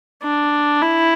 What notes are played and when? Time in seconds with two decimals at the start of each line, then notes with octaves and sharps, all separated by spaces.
0.23 D4
0.82 E4